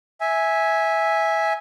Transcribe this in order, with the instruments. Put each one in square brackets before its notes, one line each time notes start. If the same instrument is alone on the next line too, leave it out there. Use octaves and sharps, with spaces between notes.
[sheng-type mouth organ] E5 G#5